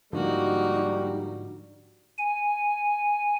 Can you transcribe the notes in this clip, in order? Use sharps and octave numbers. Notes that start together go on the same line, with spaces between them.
G#2 D3 F3 G3 A#3 D#4 F#4
G#5